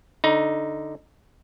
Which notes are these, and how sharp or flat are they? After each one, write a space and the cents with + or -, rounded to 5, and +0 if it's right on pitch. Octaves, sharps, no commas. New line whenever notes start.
D3 +0 D#4 +0 A#5 +40